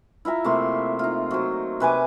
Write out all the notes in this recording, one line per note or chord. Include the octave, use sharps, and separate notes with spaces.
E4 F4 E5 A#5
C3 A3 A#3 C6
D#4 F4
F#3 C5
C3 B4 G#5 D6